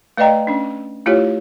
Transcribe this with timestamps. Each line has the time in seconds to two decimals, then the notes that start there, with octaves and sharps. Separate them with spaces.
0.17 A3 B4 D5 D#5 G5 A#5
0.47 C#4 D4
1.06 A3 E4 F4 G4 C#5